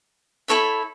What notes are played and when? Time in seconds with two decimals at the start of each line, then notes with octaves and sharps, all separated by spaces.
0.48 E4 A4 C#5 E5